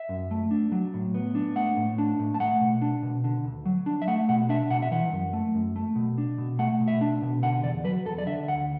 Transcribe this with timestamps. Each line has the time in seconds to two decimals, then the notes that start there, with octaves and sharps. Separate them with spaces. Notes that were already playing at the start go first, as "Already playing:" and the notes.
Already playing: E5
0.09 F#2
0.31 A3
0.51 D4
0.72 F#3
0.94 A2
1.14 B3
1.35 D4
1.56 A3 F#5
1.77 A2
1.98 D4
2.20 A2
2.34 A5
2.40 A3 F#5
2.61 B2
2.82 D4
3.03 B2
3.24 D3
3.44 D2
3.66 F#3
3.86 D4
4.02 E5
4.08 A3 F#5
4.29 B2 F#5
4.49 D4 E5
4.70 B2 F#5
4.82 E5
4.91 E3 F#5
5.12 F#2
5.33 A3
5.54 F#2
5.76 A3
5.96 B2
6.18 D4
6.38 B2
6.59 A3 F#5
6.80 B2
6.88 E5
7.01 D4
7.22 B2
7.42 D3 F#5
7.64 E2 D5
7.84 F#3 B4
8.05 E2 A4
8.18 D5
8.26 D3 E5
8.48 D2 F#5